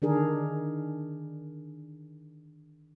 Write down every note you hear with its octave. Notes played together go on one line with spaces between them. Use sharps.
D3 D#3 D4 G#4 A#4